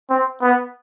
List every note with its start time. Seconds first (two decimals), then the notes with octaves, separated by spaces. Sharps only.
0.10 C4
0.41 B3